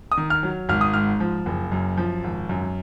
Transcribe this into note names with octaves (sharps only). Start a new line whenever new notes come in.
D#6
D#3
F6
F#3
G#1 F6
D#6
G#2 F6
F3
F#1
F#2
F3
G#1
F#2